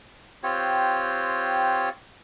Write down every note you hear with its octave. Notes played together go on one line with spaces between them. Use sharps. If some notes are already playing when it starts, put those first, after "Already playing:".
C4 F4 G4 C#5